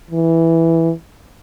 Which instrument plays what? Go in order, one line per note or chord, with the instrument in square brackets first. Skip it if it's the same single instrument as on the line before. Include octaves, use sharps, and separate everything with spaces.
[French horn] E3